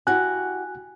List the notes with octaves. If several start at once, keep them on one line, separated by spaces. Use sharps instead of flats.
E4 F#4 G4 G#5 F#6